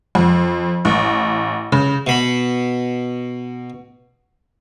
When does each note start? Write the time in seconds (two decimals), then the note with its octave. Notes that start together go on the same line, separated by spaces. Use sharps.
0.15 F2
0.85 A1
1.72 C#3
2.07 B2 B5